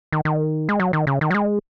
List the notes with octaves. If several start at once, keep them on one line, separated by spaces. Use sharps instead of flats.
D#3
D#3
G#3
F#3
D#3
C#3
D#3
F#3
G#3